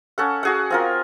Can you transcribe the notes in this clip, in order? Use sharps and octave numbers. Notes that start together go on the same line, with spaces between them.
C#4 A4 F#5
F#4 G#4 F#5
C4 F4 A#4